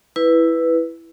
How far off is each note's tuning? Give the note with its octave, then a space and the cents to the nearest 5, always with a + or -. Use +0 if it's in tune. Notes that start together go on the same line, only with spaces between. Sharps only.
E4 +0 B4 +0